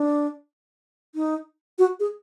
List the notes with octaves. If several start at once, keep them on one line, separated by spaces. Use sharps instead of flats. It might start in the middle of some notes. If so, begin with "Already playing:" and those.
Already playing: D4
D#4
F#4
G#4